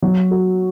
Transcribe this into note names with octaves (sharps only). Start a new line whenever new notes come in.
F#3
F#4